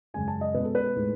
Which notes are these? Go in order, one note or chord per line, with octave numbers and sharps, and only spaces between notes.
F#2 C#3 G#3 C#4 G#5
A5
D#5
B2 G#3 C#4 B4
A4
B4
A2 G#3 D#4